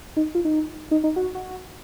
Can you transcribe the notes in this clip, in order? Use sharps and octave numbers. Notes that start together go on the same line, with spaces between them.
D#4
F4
D#4
D#4
D#4
F#4
F#4